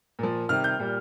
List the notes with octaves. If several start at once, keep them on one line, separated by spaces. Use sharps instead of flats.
A#2 F3
C3 D#3 G3 F6
G6
A#2 G3